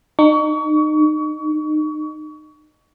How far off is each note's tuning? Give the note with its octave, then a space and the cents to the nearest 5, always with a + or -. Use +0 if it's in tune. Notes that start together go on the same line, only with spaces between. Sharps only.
D#4 -30 C#6 +30